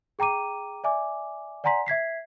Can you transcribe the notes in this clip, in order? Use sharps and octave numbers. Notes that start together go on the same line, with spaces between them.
G#4 G5 A#5 D6 D#7
D5 E5 G#5 D6
D5 F#5 G#5 A#5 C6 B6
E5 G#6 B6 C7